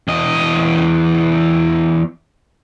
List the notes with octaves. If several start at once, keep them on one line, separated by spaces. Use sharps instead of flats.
E2 D#5